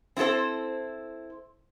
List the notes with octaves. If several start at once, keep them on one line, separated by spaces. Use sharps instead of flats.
C4 E4 F4 A4 C5